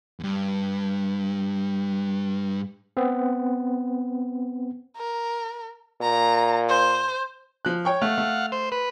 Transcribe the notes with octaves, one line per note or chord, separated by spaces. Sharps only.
E2 G2
B3 C4
A#4
A#2 A#5
C5
F3 F#6
C#5 G5 C#6
A3 F5 F#5
A3
C5
B4